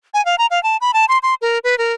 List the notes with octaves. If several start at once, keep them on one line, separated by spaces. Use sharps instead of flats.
G#5
F5
A#5
F5
A5
B5
A5
C6
C6
A#4
B4
A#4